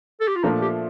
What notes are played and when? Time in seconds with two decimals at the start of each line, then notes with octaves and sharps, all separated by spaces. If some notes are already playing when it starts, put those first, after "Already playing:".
0.21 A4
0.28 G4
0.36 F4
0.43 A#2 F3 A3 D4 D#4
0.62 G4